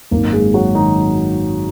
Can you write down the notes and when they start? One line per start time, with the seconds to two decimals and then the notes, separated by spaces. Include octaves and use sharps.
0.11 G#1 F#2 D#3 A#3 A#4
0.33 G#3 G#4
0.54 F#3 F#4
0.75 D#3 D#4